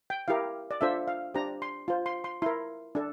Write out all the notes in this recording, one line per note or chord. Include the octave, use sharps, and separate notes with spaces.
G5
E4 G4 A#4 F5
D5
D4 F4 A4 C5 E5
F5
D4 G4 C5 A#5
C6
F4 C5
C6
C6
E4 A#4 C6
D4 A4